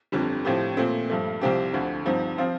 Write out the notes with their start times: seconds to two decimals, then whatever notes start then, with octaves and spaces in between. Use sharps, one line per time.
0.12 G1 F2 D3 G3
0.45 A2 F3 C4 G4
0.77 A#2 A3 C4
1.10 G2 F3 A3
1.41 C2 C3 F3 C4 G4
1.74 D2 D3 F3
2.06 G2 F3 C4 D#4
2.38 F3 C4 F4